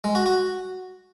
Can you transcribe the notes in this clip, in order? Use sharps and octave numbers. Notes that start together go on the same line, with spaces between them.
G#3
F#4
F#4